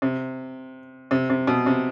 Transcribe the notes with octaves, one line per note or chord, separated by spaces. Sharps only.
C3
C3
C3
B2
C3